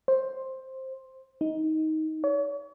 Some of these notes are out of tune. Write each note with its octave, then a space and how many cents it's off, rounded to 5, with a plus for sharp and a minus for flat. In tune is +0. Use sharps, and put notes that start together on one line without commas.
C5 +10
D#4 +15
C#5 +40